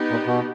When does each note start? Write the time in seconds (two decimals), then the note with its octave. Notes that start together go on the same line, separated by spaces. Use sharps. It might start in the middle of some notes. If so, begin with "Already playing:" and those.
Already playing: B3 D#4 G4
0.11 A#2
0.27 B2